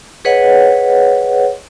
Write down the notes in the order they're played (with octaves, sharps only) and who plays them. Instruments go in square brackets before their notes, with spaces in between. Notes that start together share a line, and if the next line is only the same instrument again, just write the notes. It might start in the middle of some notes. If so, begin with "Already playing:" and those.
[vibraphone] G#4 B4 C#5 D#5 F#5